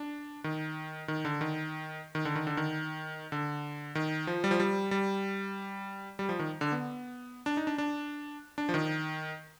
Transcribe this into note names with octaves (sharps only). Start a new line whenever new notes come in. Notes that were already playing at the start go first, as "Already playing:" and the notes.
Already playing: D4
D#3
D#3
D3
D#3
D#3
D3
D#3
D3
D#3
D3
D#3
F3
G3
F3
G3
G3
G3
F3
D#3
D3
B3
D4
D#4
D4
D4
D4
F3
D#3